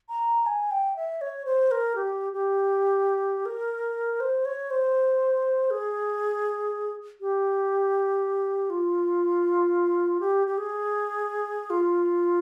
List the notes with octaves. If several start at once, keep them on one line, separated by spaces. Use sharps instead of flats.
A#5
G#5
G5
E5
C#5
C5
A#4
G4
G4
A#4
C5
C#5
C5
G#4
G4
F4
G4
G4
G#4
F4